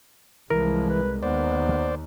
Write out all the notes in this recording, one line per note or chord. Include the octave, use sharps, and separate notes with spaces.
C2 E3 F3 G#3 A#4
B4
D#2 B3 C5 D5